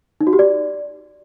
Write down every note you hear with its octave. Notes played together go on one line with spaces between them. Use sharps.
D#4
F#4
G4
D5